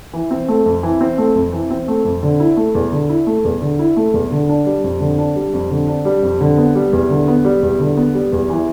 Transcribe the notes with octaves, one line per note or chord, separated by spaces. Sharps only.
E3
C4
A3
F2
E3
C4
A3
F2
E3
C4
A3
F2
D3
E4
A3
E2
D3
E4
A3
E2
D3
E4
A3
E2
D3
D4
G3
F2
D3
D4
G3
F2
D3
D4
G3
F2
D3
B3
G3
E2
D3
B3
G3
E2
D3
B3
G3
E2
E3